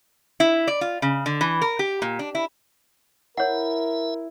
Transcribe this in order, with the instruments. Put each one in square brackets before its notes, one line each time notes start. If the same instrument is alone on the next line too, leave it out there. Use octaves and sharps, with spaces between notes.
[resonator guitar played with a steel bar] E4
D5
F4
C#3
D3
E3
A#4
G4
A#2
D4
E4
[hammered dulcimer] E4 [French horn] A#4 [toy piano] C#5 F#5 [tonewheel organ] E5